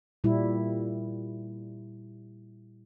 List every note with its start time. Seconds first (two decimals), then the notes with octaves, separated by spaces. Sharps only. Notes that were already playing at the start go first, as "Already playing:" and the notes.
0.24 A#2 G3 E4